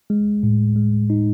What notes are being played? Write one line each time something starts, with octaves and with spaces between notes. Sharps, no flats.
G#3
A2
G#3
D#4